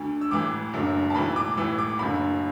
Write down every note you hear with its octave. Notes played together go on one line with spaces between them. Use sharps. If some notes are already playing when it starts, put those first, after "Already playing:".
Already playing: D2 D3
E6
A1 A2 E3 D6
F#1 F#2 D3
A5
B1 A2 E3 B5
D6
A1 A2 E3 E6
D6
F#1 F#2 D3 B5